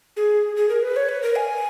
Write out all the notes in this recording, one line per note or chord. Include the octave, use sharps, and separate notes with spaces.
G#4
G#4
A#4
B4
C#5
B4
A#4
G#5